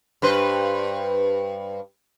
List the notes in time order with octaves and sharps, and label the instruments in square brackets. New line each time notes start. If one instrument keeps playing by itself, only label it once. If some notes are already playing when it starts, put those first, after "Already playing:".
[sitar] G2 B4 C5